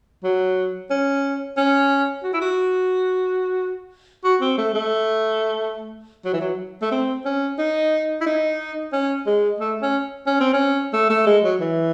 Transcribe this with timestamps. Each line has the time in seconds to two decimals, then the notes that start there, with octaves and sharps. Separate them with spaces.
0.24 F#3
0.91 C#4
1.57 C#4
2.24 F#4
2.34 E4
2.42 F#4
4.24 F#4
4.41 C4
4.58 A3
4.74 A3
6.25 F#3
6.34 E3
6.41 F#3
6.82 A3
6.92 C4
7.26 C#4
7.59 D#4
8.21 E4
8.26 D#4
8.93 C#4
9.26 G#3
9.60 A3
9.82 C#4
10.27 C#4
10.40 C4
10.54 C#4
10.94 A3
11.10 A3
11.27 G#3
11.44 F#3
11.61 E3